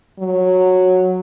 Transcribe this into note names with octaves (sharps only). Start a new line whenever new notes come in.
F#3